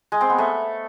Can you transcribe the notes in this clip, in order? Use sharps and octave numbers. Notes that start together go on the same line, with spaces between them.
G#3
C4
B3
A3